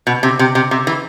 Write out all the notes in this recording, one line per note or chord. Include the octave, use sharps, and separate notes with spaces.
B2
C3
C3
C3
C3
E3